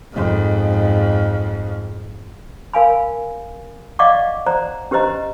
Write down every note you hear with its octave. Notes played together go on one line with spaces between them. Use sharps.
F2 G#2
A#4 F5 G#5 B5
D5 D#5 F5 F#5 C#6 D6
C5 D5 F#5 A#5
C#4 G4 B4 C5 D#5 A#5